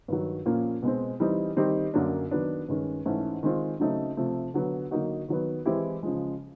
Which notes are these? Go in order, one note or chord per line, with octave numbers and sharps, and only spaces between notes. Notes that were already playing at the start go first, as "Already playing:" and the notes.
G2 D#3 F#3
A#2 F3 A#3 C#4
B2 G#3 C4
E3 G3 C4 D#4
D#3 G3 C4 D#4 G4
F#2 D3 F#3 A#3 D4
D#3 F#3 B3 D4
G2 D#3 G#3 C#4
G#2 E3 A3 C#4
D#3 G#3 C4 F4
C#3 F#3 A3 C4 D#4
C3 F3 A3
D3 F#3 B3
D3 F#3 A#3 D#4 F#4
D#3 F#3 B3
E3 G#3 C4 E4 G4
C#3 F3 G#3